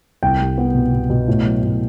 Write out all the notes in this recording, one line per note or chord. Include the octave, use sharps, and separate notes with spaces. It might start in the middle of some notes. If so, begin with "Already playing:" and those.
C2 G5
G3
B3
B2
B2
B2
A2
F#3
A2